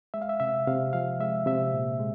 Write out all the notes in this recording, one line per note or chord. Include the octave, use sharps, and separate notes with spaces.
G#3 E5
F5
E5
C3 E5
C3 F5
F3 F5
G#3 E5
C3 E5
A#2
G#3